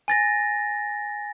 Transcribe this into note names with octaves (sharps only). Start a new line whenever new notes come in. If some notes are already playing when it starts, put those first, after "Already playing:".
G#5 A6 A#6